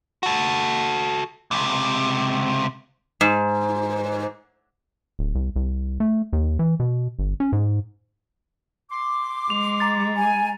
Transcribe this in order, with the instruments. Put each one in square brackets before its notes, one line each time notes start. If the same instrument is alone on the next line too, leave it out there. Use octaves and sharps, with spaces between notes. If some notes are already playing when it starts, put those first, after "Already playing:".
[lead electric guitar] F#4 A4
C#2 C3
[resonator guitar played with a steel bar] G#2
[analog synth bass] D1
C2
C2
A3
D#2
E3
B2
G1
C#4
G#2
[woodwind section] C6 D6
[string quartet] G#3 [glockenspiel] F7
[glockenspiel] A#5 A6
[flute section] G#5